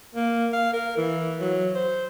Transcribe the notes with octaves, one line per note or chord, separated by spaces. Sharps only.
A#3
F5
A#4
E3
F#3
C5